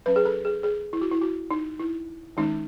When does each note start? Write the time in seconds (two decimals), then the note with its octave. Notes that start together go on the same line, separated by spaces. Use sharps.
0.06 F#3 C#4 B4
0.16 G#4
0.25 A4
0.45 G#4
0.63 G#4
0.93 E4
1.01 F#4
1.11 E4
1.21 F#4
1.51 D#4
1.79 E4
2.37 D#3 G#3 C#4 D#4